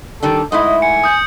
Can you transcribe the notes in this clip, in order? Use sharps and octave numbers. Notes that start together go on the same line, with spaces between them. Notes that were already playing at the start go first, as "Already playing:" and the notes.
D#3 G3 D4 A4
G#2 A3 E4 D#5
G#5 C#7
D#6 G6